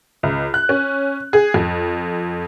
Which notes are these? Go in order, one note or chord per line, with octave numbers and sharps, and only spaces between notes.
C#2
F#6
C#4
G#4
F2